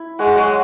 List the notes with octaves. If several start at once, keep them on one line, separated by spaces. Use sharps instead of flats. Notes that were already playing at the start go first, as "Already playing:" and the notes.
Already playing: E4
G#3 F#4
F#3 F#4